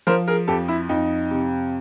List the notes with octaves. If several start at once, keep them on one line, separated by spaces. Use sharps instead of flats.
F3 A#4 C5
G#4 A#4
F2 G4 A4
E4
F2 D#4
C3